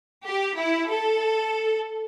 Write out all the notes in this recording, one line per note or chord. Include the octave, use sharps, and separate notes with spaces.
G4
E4
A4